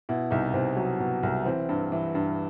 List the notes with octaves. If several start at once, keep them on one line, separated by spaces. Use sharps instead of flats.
B2 E4
C2 D#4
C2 C4
F#3
B2
C2
E3 C4
G2
E3
G2